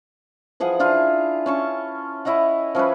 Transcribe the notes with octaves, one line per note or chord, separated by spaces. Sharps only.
E3 F3 G#4 F#5
D4 E4 F4
C#4 A5 C#6
E4 C#5 D#5 F#5
F3 C#4 E4 B4